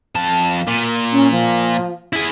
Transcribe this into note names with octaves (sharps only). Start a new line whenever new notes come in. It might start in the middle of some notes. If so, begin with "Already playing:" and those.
F2 A5
A#2
C#4
F3
E4 G#4